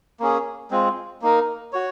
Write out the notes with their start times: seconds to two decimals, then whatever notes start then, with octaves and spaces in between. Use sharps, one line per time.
0.20 A#3 C#4 G#4
0.71 G#3 C4 F4
1.22 A#3 D#4 A#4
1.73 F#4 C#5